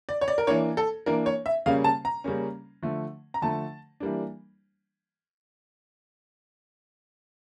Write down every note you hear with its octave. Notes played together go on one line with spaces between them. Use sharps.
D5
C#5
D5
A#4
E3 A#3 D4 C#5
A4
E3 A#3 D4 A#4
C#5
E5
C#3 G3 A#3 C#4 F5
A5
A#5
C#3 G3 A#3 C#4
D3 F3 A3
A#5
D3 F3 A3 A5
E3 G3 A#3 D4